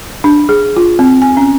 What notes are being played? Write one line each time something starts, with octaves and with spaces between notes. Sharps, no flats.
D4
G#4
F4
C4
G#5
C#4